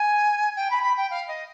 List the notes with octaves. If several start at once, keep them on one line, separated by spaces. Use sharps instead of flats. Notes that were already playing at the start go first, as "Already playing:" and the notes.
Already playing: G#5
G5
B5
B5
G5
F5
D#5